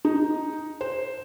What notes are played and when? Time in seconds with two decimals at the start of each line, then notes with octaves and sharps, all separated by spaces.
0.05 D#4
0.81 C5